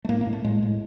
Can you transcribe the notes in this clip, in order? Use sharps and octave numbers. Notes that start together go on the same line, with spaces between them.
A3
A2 A#3
A#3
A2
A3
A2 G#3
A2